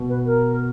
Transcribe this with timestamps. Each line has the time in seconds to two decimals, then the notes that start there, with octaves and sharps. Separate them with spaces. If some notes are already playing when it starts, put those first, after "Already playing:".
Already playing: B2
0.09 B4
0.26 A#4